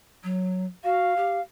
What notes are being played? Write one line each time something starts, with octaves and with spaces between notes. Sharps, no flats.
F#3
F#4 F5
G4